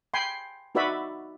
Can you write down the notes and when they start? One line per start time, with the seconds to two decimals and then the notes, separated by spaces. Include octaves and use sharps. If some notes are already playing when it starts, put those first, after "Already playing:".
0.14 G5 G#5 B5 C6
0.75 D#4 F#4 B4 D5 E5 B5